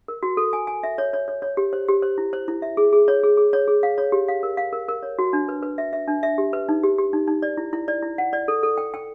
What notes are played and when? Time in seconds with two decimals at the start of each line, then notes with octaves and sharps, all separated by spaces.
0.08 A#4
0.23 F#4
0.37 A4
0.53 G#5
0.67 G#5
0.83 E5
0.98 C#5
1.13 C#5
1.28 C#5
1.42 C#5
1.57 G4
1.73 C5
1.88 G4
2.02 C5
2.18 E4
2.33 C5
2.48 E4
2.62 E5
2.77 G#4
2.93 G#4
3.08 C#5
3.24 G#4
3.37 G#4
3.53 C#5
3.68 G#4
3.83 F5
3.98 C#5
4.12 G4
4.28 F5
4.43 A#4
4.57 F5
4.73 A#4
4.89 A#4
5.03 C#5
5.19 F#4
5.33 D4
5.49 B4
5.63 B4
5.78 E5
5.93 E5
6.08 D4
6.23 E5
6.38 G4
6.53 B4
6.69 D#4
6.83 G4
6.98 G4
7.13 D#4
7.27 D#4
7.42 D5
7.57 E4
7.73 E4
7.88 D5
8.03 E4
8.18 F#5
8.33 D5
8.48 A4
8.63 A4
8.78 G5
8.94 G5